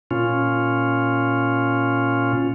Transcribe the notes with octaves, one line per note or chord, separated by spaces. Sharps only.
A#2 C#4 F4